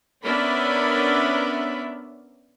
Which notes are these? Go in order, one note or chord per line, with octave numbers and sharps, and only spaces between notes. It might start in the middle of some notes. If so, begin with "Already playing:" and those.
B3 C#4 D4 A#4 E5 B5